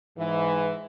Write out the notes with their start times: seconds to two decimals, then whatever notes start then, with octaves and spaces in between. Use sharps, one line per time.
0.19 G#2 E3